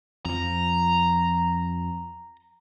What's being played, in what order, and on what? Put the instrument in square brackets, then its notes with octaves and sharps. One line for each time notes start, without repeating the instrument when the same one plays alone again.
[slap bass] F2 F3 [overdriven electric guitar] A#5